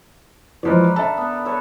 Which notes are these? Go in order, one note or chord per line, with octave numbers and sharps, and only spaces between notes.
E3 F3 G#3 A#4 B4 D5
D3 A4 E5 A5
B3
A4 B4 C#5